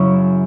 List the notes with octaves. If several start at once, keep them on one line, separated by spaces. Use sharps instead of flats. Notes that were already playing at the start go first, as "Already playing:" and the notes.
Already playing: F#2 C#3 F#3 C#4 E4